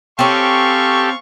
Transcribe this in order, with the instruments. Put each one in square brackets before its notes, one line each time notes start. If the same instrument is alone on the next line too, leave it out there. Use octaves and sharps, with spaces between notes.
[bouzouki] C4 C#4 [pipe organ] G4 A4 [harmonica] F5 C#6